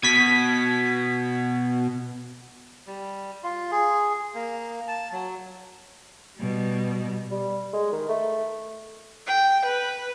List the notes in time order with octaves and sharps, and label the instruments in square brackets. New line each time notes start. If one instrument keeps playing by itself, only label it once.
[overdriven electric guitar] B2 [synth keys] G#6 B6
[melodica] G3
F4
G#4
A#3
A5
F#3
[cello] B2 G3
[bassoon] G3
G#3
D#3
A3
[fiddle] G5
B4